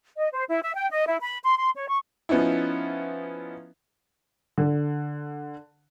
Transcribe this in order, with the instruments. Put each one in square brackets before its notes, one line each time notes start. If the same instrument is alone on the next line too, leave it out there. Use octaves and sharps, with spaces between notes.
[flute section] D#5
C5
E4
E5
G5
D#5
E4
B5
C6
C6
C#5
C#6
[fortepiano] F3 B3 C#4 D#4 E4
[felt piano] D3